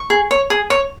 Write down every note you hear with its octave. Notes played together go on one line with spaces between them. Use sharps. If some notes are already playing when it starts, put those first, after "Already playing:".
Already playing: C#6
G#4
C#5
G#4
C#5